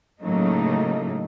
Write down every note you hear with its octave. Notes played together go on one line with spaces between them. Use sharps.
A2 C#3 F#3 A3 A#3 D#4